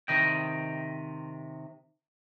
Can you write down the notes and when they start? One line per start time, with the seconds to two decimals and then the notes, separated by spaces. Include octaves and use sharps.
0.08 C3 D#3 D#5 G5